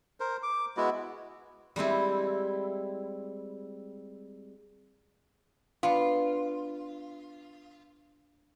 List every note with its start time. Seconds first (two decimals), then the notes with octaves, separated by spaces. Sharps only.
0.20 A#4 C5
0.43 D6
0.77 G#3 B3 E4 F#4
1.76 G3 G#3 C4 E4
5.83 B3 D4 F4